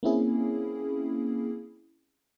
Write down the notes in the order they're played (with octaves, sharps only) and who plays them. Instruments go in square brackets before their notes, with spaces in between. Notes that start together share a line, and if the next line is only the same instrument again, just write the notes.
[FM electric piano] A#3 C4 C#4 E4 G#4